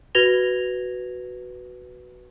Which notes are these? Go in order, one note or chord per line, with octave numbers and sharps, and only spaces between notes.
F#4 B4 G#6 A#6 F7 G7